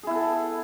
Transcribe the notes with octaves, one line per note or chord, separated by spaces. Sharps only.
B3 E4 G#4 A4